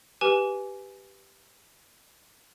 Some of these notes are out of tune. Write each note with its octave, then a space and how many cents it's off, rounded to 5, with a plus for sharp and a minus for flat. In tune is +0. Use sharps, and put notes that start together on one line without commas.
G4 +0 B4 +0 G#5 +10